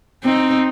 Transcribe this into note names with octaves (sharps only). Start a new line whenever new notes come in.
C4 D#4